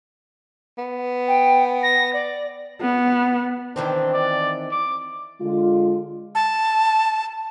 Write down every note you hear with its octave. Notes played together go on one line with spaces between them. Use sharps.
B3
G5
A#6
D5
B3
D#3 E3 C4 D4
D5
D6
D3 G#3 F4
A5